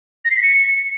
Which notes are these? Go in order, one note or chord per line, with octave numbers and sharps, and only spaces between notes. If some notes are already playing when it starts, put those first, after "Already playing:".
A#6
C7
B6
C#7